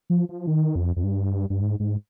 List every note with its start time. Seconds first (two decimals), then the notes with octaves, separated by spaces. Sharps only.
0.10 F3
0.29 F3
0.47 D#3
0.75 F2
0.96 F2
1.04 G2
1.50 G2
1.61 G#2
1.80 G#2